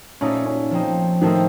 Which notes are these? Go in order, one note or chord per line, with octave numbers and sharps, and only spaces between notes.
A#2 A3 C#4 D#4
C#4
F3 C4 D#4
A2 D#3 A3 C4 D#4